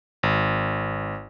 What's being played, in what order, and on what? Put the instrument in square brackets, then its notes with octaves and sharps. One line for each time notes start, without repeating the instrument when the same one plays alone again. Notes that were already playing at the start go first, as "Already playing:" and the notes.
[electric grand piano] G#1